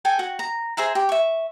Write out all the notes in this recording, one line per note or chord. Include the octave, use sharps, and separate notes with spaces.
A4 G5 G#5
F#4
A#5
G#4 C5 E5 A#5
G4
E5 C#6